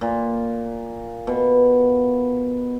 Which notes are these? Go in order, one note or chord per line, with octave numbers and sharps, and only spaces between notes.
A#2
B2